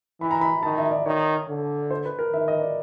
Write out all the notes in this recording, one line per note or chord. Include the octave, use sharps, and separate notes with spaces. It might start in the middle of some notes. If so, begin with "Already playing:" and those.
E3 B5
A#5
B5
D#3 A5
E5
D5
D#3 C#5
D3
C5
B4
A#4
D#3 E5
D#5
D5